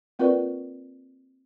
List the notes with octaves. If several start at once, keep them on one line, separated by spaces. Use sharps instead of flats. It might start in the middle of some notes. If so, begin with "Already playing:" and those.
A#3 C4 F4 A#4 B4 D5